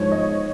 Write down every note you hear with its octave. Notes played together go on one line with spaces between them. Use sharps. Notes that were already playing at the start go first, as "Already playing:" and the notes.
Already playing: G#2 F3 G#3 C#5
D#5